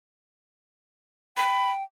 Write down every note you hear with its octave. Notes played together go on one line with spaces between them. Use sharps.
G5 B5